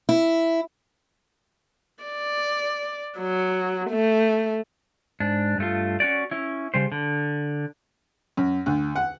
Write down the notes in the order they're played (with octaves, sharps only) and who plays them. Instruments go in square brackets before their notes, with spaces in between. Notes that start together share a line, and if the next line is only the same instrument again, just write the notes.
[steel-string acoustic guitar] E4
[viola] D5
F#3
A3
[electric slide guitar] G#2 D4
G2 A3 F4
C#4 F#4 D5
C#4 E4
C#3 G3 C5
D3
[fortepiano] F#2
D2
F#5